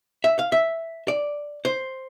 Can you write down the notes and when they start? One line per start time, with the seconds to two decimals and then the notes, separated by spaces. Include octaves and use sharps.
0.24 E5
0.39 F5
0.52 E5
1.08 D5
1.65 C5